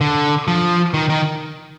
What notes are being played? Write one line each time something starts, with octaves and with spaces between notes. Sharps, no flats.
D3
F3
D#3
D#3